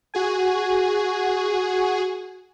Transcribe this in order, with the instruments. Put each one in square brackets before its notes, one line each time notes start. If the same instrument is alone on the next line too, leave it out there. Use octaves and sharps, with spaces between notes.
[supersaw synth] F#4 G#4 G#5